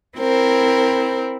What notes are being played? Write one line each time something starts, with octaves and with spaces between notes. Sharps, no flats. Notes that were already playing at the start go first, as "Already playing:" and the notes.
C4 E4 A#4 C5